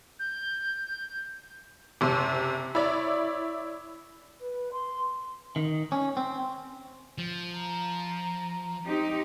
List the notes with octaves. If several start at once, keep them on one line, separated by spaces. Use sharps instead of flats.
G6
F#1 C3 C6
E4 C#5 D5
B4
C6
D#3
C#4
C4
F3
A#5
C4 D#4 G4